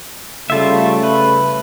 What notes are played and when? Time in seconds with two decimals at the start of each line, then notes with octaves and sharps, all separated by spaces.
0.50 C#3 G3 A3 F4 E5
1.03 B4